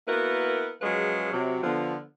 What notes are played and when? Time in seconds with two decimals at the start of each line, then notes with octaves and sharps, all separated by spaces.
0.08 A#3 B3 E4 F#4 A#4 B4
0.81 F3 F#3 G#3 C#4 G#4 B4
1.33 C3 F#3
1.63 D3 F3 B3